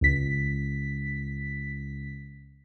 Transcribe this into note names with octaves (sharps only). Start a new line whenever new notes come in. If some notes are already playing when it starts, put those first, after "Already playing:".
C#2 B6